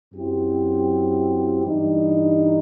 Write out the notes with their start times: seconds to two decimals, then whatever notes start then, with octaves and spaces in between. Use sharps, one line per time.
0.13 F#2 F#3 C4 E4 G4
1.64 G2 E3 G3 D#4